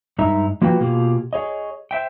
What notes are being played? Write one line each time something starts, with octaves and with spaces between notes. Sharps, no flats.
G2 G#3 D#4 E5 A#5
F3 A#3 F4 F#4 B4 G5
B2 A#3 F4 G4 G#4
G#4 C#5 D#5
C5 E5 G5